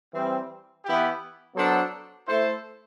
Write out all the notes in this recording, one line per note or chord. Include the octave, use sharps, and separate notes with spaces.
E3 G3 C4
E3 B3 E4 G4
F#3 B3 D4 A4 C5
A3 E4 A4 C5